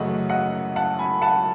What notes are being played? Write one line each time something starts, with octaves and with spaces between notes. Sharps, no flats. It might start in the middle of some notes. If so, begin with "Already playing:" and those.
Already playing: F#2 C#3 E3 A3 D#5 F#5
D#5 F#5
F#5 A5
G#5 B5
F#5 A5